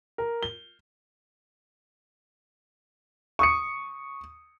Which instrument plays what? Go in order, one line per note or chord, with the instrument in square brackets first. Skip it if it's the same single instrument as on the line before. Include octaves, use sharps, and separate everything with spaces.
[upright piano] A#4
G7
[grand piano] C#6 D#6 C#7